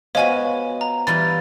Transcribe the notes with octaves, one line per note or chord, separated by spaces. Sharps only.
B3 F4 F#4 C5 C#5 D#5 F5 G#5
A#5
E3 G3 F4 B5 A6